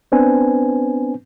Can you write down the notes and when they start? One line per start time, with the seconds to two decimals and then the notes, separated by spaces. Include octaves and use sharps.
0.12 B3 C4 D4 B4 C5 G#5